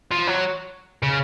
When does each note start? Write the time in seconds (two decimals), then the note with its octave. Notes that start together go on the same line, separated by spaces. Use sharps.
0.11 F3
0.27 F#3
1.03 C#3